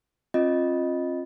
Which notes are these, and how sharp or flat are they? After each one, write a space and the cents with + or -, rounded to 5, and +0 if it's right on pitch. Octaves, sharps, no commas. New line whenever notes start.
C4 +40 F4 +0 D#5 +0